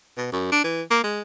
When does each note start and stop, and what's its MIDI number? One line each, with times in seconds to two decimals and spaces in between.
0.17 0.30 47
0.32 0.51 42
0.52 0.64 62
0.64 0.82 52
0.91 1.00 58
1.04 1.22 56